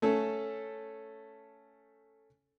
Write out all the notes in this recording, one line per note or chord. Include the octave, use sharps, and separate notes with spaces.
A3 C#4 A4